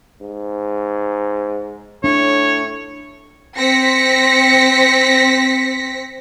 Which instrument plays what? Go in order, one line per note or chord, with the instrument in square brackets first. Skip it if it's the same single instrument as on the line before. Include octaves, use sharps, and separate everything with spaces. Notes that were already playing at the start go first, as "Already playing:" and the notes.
[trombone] G#2
[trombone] A2 [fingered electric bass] D4 [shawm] C#5
[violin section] C4 A#6 B6 C#7